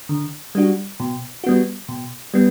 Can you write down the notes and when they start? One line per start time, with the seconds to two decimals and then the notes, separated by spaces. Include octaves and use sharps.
0.09 D3
0.55 G3 D4 F#4
1.00 B2
1.44 G3 B3 F#4
1.89 B2
2.34 G3 B3